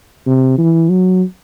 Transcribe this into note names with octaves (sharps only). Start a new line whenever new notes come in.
C3
E3
F#3